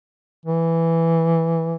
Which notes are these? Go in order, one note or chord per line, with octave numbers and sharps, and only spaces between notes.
E3